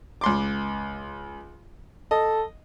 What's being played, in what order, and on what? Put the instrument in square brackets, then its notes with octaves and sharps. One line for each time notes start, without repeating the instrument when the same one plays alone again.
[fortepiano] C#2 C6 D6
[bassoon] A4 [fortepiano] D#5